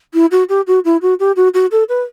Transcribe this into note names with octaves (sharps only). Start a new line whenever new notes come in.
E4
F#4
G4
F#4
E4
F#4
G4
F#4
F#4
A4
B4